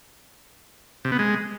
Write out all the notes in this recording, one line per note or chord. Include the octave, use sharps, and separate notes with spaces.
C3
B3
G#3